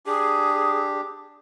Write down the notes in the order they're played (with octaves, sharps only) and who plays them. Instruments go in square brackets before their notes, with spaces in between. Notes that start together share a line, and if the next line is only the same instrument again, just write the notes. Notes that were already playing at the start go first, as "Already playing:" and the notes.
[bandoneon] D4 G4 [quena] G#4